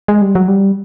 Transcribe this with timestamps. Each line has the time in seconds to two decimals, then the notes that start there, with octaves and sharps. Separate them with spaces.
0.08 G#3
0.22 G3
0.35 F#3
0.48 G3